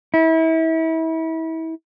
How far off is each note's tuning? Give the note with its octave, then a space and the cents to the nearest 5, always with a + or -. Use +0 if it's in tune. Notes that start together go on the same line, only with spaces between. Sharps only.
E4 -30